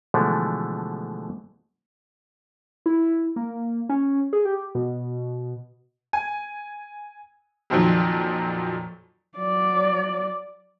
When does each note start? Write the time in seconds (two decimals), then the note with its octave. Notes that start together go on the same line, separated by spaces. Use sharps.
0.14 B2 D3 E3 F3 G#3 A3
2.86 E4
3.36 A#3
3.89 C#4
4.33 G#4
4.45 G4
4.75 B2
6.13 G#5
7.70 F2 A#2 D#3 F3 F#3
9.37 F#3 D5